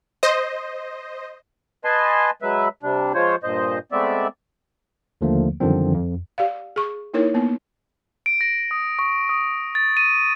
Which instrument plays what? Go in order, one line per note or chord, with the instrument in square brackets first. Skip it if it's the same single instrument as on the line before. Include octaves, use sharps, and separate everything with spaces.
[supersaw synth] C5 D#5
[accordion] B4 D#5 G#5 A5 C6
F#3 G#3 B4 E5
C3 G3 D4
F3 G#3 F4 C5 C#5
G2 A#2 C5 D#5
G#3 A3 B3 C4 D5 E5
[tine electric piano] D#2 D3 F3 A3 A#3
F#2 D3 D#3 F3 G3 C4
F2
[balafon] G4 D5 F5
G#4 C#6
A#3 D#4 E4 A#4 C#5
A#3 B3
[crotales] D7
A#6
D#6
C#6
D#6
A6
D#7